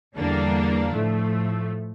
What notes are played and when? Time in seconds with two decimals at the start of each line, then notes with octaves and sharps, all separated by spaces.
0.16 E2 D3 G3 A#3 D4
0.93 A2 F3 A3